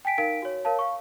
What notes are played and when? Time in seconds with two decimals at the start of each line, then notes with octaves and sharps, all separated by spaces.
0.05 G5 G#5 B6 D7
0.18 D#4 A#4 F5 B6 D7
0.42 F#4 C#5
0.65 A#4 C#5 F5 A5
0.79 F5 C#6